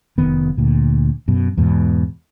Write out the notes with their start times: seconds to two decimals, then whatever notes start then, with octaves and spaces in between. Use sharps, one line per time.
0.18 F1 D#3 B3
0.57 D2 A#2
1.28 F#2 B2
1.57 E2 G#2 B2